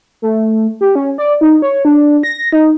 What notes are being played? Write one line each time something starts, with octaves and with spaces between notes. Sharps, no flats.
A3
G4
C#4
D5
D#4
C#5
D4
A#6
D#4